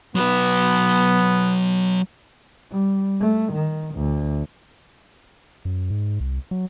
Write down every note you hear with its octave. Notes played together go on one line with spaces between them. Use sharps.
F#3 B3 B4
G3
A3
D#3
D2
F#2
G#2
C2
F#3